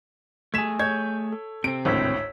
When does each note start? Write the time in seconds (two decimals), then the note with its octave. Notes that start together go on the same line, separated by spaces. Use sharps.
0.54 A3 G#4 G#6 B6 E7
0.79 C#5 G6 G#6
1.32 A4
1.64 C3 C4 D7
1.85 G#1 D2 A2 C#5 E6 B6